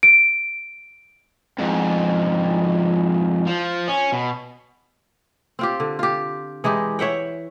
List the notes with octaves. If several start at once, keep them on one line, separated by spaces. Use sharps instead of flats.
D7
F2 G#2
F3
C#4
B2
C4 F4 G4
D3
F4 G4
E3 G#3 D#4 G4
C#5 E5 F#5 G5